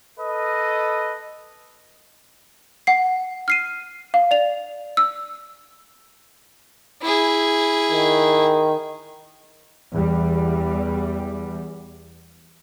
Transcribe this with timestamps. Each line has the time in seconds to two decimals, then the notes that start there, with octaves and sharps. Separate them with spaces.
0.19 A4 B4 D#5
2.87 F#5 C7
3.48 F6 C7 D#7
4.14 F5
4.31 D5 F7
4.97 E6
7.02 E4 G#4
7.91 D#3
9.93 E2 G3